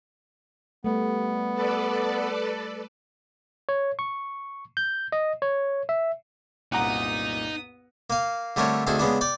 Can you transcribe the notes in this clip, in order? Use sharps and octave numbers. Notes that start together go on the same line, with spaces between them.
G3 A3 B3
A4 B4 D5
C#5
C#6
G6
D#5
C#5
E5
C2 F#2 A#2 B3 D#4 F#5 A#5 D#6
A#3 F5
D3 G3 A3 C4 A#4 C#5
D2 D#3 C4 G#4 A4
C#3 G#3 B3 D4
D5 G5 D6